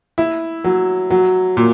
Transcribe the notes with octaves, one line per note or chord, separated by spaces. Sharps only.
E4
F#3
F#3
A#2